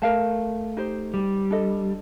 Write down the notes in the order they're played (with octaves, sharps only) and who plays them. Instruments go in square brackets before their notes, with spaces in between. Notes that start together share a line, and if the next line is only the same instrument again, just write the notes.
[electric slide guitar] A3 [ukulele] A#4 F5 A5
[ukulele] D#4 G4 C5
[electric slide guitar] G3
[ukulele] D4 A4 D#5